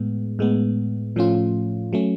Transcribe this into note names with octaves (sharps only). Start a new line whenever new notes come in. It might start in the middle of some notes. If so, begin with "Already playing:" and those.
Already playing: A2 G#3 B3
A2 G#3 B3
A2 F3 A3 C#4 F4
F#3 A3 C#4